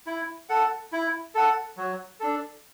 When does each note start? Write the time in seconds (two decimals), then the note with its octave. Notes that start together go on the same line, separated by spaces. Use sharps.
0.07 E4
0.49 A4 F#5
0.92 E4
1.35 A4 F#5
1.77 F#3
2.20 D4 A4